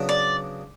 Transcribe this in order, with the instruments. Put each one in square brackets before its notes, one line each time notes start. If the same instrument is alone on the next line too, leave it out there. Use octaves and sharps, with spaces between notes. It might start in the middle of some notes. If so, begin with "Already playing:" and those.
Already playing: [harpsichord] C#3 F#3 B3 D4
[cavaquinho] D5